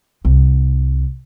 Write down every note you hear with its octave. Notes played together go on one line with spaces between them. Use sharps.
C2